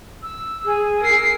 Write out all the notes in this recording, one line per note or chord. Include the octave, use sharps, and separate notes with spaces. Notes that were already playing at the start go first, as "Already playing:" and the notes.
E6
G#4
A#4 E6 C7